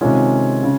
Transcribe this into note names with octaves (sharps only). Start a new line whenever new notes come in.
C3 D#3 G#3 C#4 F4
C#3